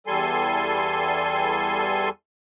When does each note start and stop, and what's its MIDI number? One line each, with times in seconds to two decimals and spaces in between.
0.07 2.09 40
0.07 2.09 55
0.07 2.09 69
0.07 2.09 80
0.07 2.09 84